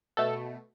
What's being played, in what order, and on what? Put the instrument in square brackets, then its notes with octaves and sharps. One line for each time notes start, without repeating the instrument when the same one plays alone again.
[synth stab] B2 A3 A4